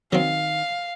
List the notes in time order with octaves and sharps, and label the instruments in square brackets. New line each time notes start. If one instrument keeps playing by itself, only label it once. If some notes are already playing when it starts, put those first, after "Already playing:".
[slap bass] D#3 [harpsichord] F#3 C4 [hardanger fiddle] F5